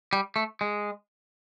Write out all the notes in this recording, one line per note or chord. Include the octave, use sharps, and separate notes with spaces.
G3
A3
G#3